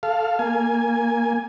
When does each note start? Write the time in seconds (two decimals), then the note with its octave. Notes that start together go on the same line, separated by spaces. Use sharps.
0.03 A4 F5
0.39 A#3 G#5